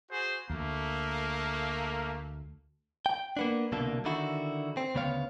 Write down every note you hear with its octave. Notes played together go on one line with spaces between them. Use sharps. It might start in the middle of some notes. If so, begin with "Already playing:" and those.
F#4 G#4 C5
D2 A3 A#3
G5
A#3 B3 D4
C2 B2 D3 A#3 A4
D3 D#3 E4 F#4
C4
D2 C#3 B3 C#5 F5